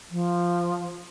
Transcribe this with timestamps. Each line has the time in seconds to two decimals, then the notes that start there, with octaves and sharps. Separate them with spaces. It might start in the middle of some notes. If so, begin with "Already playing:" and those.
0.11 F3